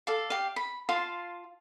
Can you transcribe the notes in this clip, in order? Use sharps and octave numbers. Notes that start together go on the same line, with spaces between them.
A4 D5 F5
G4 F5
B5
F4 F5 A5 C6